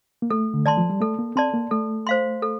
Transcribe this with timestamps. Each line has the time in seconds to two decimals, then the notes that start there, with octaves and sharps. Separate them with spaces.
0.22 A#3
0.30 A3 A4
0.54 D3
0.66 D#3 D5 A5 C6
0.78 F3
0.90 G3
1.01 A3 A4
1.19 A#3
1.36 C4 D5 A5 C6
1.54 A#3
1.71 A3 A4
2.07 C5 F5 C6
2.42 A4